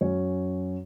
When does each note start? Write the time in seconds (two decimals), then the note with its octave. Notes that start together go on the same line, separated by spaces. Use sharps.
0.01 F#2 F#3 C#4 F#4 C#5